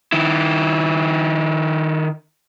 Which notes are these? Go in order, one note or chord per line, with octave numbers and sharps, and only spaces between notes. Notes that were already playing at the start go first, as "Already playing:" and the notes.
D#3 E4